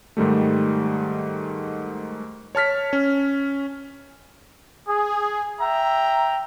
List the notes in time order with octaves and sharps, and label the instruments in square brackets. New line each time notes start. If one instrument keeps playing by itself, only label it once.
[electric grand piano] G#2 D#3 G3 A3
C#5 A5 F6 B6
C#4
[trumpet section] G#4
E5 G5 A#5